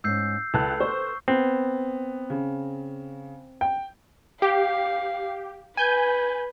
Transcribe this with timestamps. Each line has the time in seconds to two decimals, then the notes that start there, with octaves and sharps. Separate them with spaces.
0.04 G#2 C#4 E6 G6 C7
0.54 C#2 A4 B4 A5 F#6
0.80 C5 C#6
1.28 B3 C4
2.30 C#3
3.61 G5
4.42 G4 F5
5.77 B4 G#5 G6